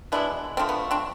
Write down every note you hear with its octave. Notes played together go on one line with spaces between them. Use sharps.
B2 G#3 B3 D4 E4
D3 F3 A3 C4
B3
C4 D4